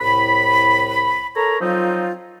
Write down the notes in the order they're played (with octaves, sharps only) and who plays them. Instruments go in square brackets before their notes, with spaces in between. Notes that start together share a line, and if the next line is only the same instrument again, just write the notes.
[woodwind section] C2 A2 B5
A4 A#4 C#5 A#5
F3 F#3 C4 D#4 F4